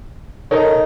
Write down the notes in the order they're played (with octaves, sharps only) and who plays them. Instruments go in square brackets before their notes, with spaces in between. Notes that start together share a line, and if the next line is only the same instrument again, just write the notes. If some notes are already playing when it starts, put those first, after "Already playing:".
[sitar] D#4 [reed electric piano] A4 A#4 C#5